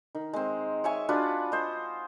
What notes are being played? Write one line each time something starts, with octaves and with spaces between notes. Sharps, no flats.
D#3
G#3 C4
C#5 E5 G#5 C#6
D4 F4 F#4 B4
C5 D#5